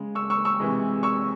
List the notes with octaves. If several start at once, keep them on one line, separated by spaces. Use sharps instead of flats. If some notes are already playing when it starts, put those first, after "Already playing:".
Already playing: C#3 G#3
C#6 E6
C#6 E6
C#6 E6
C3 E3 G#3
C#6 E6